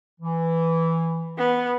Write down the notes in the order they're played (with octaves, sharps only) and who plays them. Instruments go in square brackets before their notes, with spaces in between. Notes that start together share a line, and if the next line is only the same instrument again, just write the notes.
[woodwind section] E3
[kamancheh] B3